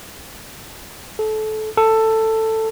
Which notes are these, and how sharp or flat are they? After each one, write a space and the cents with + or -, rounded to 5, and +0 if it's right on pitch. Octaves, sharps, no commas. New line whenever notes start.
A4 -25
A4 +10